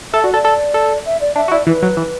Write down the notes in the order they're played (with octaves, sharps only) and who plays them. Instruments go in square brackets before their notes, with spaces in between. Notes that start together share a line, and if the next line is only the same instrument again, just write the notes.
[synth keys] A4 [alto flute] E5
[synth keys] F#4 [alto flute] D5
[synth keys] A4 [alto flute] D5
[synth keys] A4
A4
[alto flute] E5
D5
[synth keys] D4 [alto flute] E5
[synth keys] F#4
[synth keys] E4 [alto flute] D5
[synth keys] E3 [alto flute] B4
[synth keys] F#3
E3